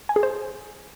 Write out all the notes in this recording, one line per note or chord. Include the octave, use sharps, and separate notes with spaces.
G#5
G#4
C5